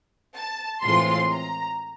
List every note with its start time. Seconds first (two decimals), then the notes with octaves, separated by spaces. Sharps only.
0.36 A5
0.82 A2 E3 G#3 C4 F4 C6
1.30 A#5